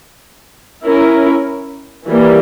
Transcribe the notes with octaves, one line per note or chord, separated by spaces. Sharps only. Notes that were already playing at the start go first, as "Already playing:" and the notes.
C#4 E4 A#4
E3 G3 A#3